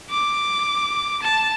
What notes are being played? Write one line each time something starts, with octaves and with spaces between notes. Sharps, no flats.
D6
A5